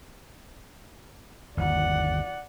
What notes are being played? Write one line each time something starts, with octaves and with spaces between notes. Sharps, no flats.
G1 D#2 D5 F#5